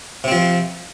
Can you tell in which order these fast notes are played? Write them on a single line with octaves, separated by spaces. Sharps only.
C3 C4 F3